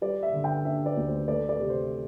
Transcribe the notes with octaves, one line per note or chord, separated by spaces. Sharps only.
G3 D5
E5
D3
G5
D4 E5
D5
D2
C5
A3 D5
D5
C3
C5